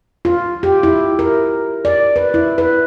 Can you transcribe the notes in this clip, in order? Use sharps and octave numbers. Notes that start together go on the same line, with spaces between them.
F4
G4
E4
A#4
D5
B4
E4
B4